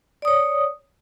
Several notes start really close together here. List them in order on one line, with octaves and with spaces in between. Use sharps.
D5 D#6 C#5